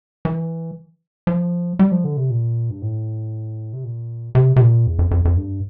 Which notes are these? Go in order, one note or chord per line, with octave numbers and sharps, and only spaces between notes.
E3
F3
G3
F3
D3
C3
A#2
G2
A2
C3
A#2
C3
C3
A#2
E2
F2
F2
F2
G2